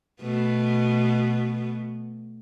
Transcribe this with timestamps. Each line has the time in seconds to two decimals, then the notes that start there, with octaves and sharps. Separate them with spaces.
0.21 B2 A3 B3